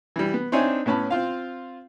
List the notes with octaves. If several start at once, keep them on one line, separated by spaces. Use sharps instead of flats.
E3 G3
B3
C4 D4 D#4 C#5 E5 G#5
A2 B3 C#4 A5 B5
C4 F4 F5